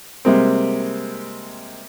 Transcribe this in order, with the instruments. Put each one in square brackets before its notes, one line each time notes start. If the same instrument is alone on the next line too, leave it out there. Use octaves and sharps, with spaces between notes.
[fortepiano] C3 G3 G#3 A#3 C4